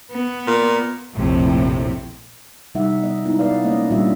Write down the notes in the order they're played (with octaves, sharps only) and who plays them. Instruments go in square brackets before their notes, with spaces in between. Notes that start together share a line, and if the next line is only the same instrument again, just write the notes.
[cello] B3
[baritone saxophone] A#2
[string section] A#1 F2 A2 C3
[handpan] C3 G3 D#4 E5 F#5
B3 D#5
G#3 B3 D#4 E4
B3 B4 D5 F5
G#3 A#3 C#4 C#5 D#5
A#2 G3 A#3 D4 F4 E5